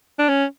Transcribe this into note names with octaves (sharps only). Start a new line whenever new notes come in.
D4
C#4